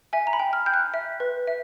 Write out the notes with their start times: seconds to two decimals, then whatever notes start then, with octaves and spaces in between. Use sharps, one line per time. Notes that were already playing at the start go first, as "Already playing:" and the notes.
0.13 E5 G#5
0.27 A#5
0.33 B5
0.39 G5
0.53 F6
0.66 G5 G6
0.74 F#6
0.94 E5
1.20 B4
1.47 E5